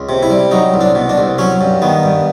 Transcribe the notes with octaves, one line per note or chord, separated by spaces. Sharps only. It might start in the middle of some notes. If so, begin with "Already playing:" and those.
Already playing: C#2
C3
E4
G3
F#3 D#4
C2
D4
B2
D4
C2
F#3 C#4
G2
D#3 B3
G2